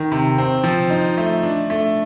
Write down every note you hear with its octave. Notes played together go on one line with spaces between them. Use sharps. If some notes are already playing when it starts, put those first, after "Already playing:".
Already playing: D#3
C3
C4
F3
D#4
A3
D4
A3